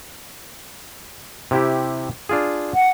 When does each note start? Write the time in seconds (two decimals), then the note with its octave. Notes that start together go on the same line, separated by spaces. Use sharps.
1.51 C3 E4 G4
2.29 D4 F4 G#4
2.74 F#5